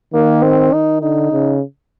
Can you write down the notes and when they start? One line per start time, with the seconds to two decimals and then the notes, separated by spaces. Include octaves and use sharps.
0.14 D#3 A#3
0.43 C4
0.73 D#3 D#4
1.02 D3 D#4
1.31 C#3